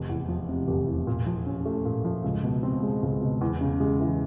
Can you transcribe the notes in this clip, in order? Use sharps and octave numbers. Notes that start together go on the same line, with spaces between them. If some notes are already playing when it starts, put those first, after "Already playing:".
Already playing: F1
E2
F3
C3
F1
E2
A#2
F3
C#4
A3
A#2
F3
C#2
B2
C4
G#3
C#2
B2
E2
C#3
G#3
E3